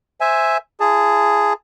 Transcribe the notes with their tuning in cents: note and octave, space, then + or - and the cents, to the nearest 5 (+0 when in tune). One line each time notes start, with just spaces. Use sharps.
C5 +0 E5 +0 G#5 +0
E4 +45 G#4 +0 A5 +10